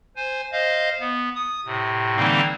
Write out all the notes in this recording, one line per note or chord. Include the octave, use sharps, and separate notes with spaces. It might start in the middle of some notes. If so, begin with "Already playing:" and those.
C5 G#5
C5 D#5 F5
B3
D#6
A2 C3
D3 E3 G3 A#3 C4 D#4